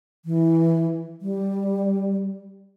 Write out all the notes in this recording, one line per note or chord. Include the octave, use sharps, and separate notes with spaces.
E3
G3